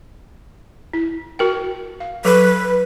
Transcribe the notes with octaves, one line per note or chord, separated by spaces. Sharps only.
E4
F#4 A#4 G5
F5
F#3 A4 B4 C#6